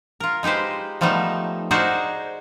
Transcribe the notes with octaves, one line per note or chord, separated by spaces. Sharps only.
F4 A#4
G#3 D#4 G4 B4 C5
F3 G3 A3 B3 D#4
D#4 F#4 G#4 A#4 C5 D5